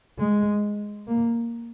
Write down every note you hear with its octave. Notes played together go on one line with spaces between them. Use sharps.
G#3
A#3